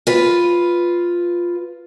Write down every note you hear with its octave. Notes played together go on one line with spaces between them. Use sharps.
F4 B4